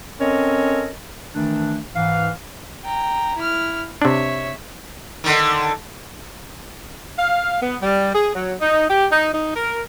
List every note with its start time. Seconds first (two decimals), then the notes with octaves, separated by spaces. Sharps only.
0.21 C4 C#4 A4 A#4 C#5 D#5
1.35 D#3 E3 A3 D4
1.95 G#2 E3 F5
2.84 G5 A#5
3.37 E4 F6
4.02 C3 D4 C#5 E5
5.24 D3 D#3
7.17 F5
7.61 B3
7.81 G3
8.13 G#4
8.34 F#3
8.60 D#4
8.89 G4
9.11 D#4
9.33 D#4
9.55 A#4